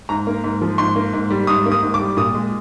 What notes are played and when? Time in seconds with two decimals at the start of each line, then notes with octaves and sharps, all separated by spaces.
0.09 G#2 A#5
0.27 A#3
0.44 G#2
0.62 F3
0.78 G#2 C6
0.96 A#3
1.13 G#2
1.31 G3
1.47 G#2 D#6
1.66 A#3
1.72 D#6
1.82 G#2
1.94 D6
2.00 G3
2.17 A#2 D#6
2.35 G#3